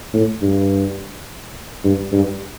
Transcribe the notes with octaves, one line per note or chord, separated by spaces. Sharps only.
A2
G2
G2
G2